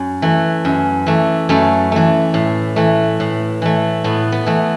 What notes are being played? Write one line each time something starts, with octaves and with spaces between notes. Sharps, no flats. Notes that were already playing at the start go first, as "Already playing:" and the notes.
Already playing: F#2
E3 A3
F#2
E3 A3
F#2 A3
E3 A3
A2
E3 A3
A2
E3 A3
A2 B3
B3
E3 A3